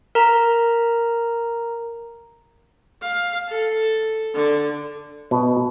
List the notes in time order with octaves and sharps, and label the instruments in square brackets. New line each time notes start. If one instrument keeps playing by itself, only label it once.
[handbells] A#4 A#5
[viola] F5
A4
D3
[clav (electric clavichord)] B2